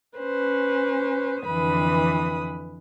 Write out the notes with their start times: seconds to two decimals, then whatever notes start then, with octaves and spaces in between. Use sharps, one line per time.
0.18 C#4 B4 C5
1.44 F2 D3 E3 B4 B5 D#6